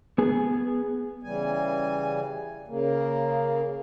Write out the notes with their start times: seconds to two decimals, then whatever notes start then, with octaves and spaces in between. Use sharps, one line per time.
0.18 B3 G#4
1.23 C#3 E3 G3 G#5
2.68 C#3 A#3